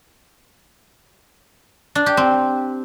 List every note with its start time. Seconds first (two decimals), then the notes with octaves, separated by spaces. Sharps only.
1.95 D4
2.06 G4
2.17 C4